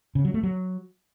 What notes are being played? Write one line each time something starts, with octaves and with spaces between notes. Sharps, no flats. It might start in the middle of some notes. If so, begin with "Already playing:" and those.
C#3
F#3
A3
F#3